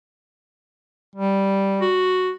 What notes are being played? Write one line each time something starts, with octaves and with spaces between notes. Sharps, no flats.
G3
F#4